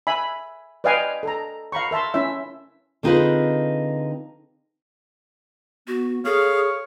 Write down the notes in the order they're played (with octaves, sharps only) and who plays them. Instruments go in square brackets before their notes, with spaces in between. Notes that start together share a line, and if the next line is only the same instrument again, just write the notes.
[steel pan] E5 G#5 B5
B4 D5 D#5 F5 G5 G#5
A4 A#5
F5 A#5 B5 C#6
A#4 E5 A5 C6
C#4 E4 E5
[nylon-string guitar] D3 C4 D#4 F4 G#4 B4
[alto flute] B3 [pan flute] F#4
[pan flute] G#4 [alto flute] A4 [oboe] C#5 [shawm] F5